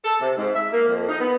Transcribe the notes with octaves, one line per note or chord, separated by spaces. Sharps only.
A4
C3
G#2
E5
A#3
F2
D#4
B3